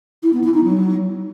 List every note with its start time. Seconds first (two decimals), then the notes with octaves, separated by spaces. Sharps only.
0.23 E4
0.33 B3
0.44 E4
0.54 D#4
0.64 F#3